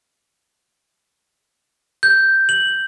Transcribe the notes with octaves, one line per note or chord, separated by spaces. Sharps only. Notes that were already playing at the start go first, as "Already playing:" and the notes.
G6
F#7